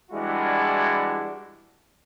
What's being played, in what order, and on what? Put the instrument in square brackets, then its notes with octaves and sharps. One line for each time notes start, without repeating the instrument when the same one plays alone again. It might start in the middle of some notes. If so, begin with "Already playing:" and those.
[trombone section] E3 G3 G#3 D4 E4 F#4